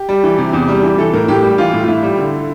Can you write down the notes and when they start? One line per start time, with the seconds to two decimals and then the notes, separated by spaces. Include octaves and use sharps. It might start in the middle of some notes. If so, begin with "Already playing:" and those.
Already playing: G4
0.09 G3
0.24 E3
0.38 C3
0.53 E2
0.68 G3
0.83 E3
0.98 E3 A4
1.13 A2 A#4
1.28 A2 G4
1.43 G3
1.58 E3 F4
1.74 A2
1.84 F4
1.88 A2 E4
2.03 G3
2.18 D3